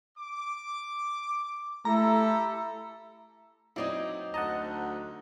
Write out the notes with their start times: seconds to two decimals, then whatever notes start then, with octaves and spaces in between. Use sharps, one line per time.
0.18 D6
1.85 A3 E4 G4 A4 A#5
3.76 F#3 C4 D#4 E4 D5 D#5
4.34 D2 D#5 F#5 A5 A#5